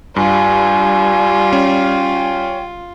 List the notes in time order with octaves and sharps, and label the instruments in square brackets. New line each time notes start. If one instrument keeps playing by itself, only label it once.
[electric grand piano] G2 [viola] G3 [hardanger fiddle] F4 [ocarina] G#5
[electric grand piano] C#4 [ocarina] G5